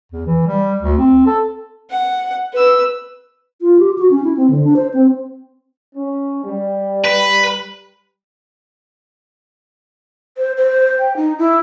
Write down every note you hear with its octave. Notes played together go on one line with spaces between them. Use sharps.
E2
E3
G3
D2
C4
A4
F#5
B4 E6
F4
G4
F#4
C#4
E4
C4
D3
D4
C5
C4
C#4
G3
B4
C5
C5
G5
D#4
E4